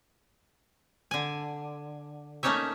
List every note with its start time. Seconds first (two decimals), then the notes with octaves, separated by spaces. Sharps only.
1.11 D3 G#5
2.43 A3 A#3 C#4 D#4 C#5 E5